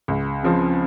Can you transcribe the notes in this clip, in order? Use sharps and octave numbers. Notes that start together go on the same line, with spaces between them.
C#2
C#3 F3 C4